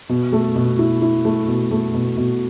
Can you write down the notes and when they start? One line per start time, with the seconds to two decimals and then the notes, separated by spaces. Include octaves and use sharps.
0.09 B2
0.32 A3
0.55 B2
0.79 E4
1.02 E4
1.25 A3
1.48 B2
1.71 A3
1.94 B2
2.17 B2